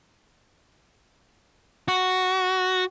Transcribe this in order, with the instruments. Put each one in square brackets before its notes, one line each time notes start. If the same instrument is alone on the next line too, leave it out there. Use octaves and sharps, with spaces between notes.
[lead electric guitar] F#4